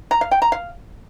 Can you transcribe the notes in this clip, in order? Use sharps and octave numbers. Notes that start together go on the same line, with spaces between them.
A#5
F5
G5
A#5
F5